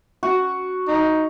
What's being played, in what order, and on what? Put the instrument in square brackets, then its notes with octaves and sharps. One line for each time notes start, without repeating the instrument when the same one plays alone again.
[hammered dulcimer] F#4
[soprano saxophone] D#4